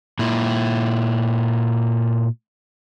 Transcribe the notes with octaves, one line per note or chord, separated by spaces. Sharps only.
A#2 E4